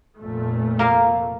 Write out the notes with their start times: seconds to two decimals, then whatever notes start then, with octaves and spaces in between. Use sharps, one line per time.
0.19 F1 A#2 A3
0.79 A#3 A#4 F5